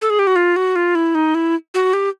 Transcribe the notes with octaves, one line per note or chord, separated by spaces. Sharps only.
A4
G#4
G4
F#4
F4
F#4
F4
E4
D#4
E4
F#4
G4